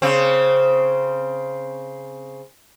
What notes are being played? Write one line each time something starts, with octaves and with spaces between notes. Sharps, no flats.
C#3 C4